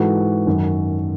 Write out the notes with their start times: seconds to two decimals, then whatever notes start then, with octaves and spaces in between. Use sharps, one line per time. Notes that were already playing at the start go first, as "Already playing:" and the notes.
Already playing: G#2 E3 F#4 A4
0.47 F#2 D#3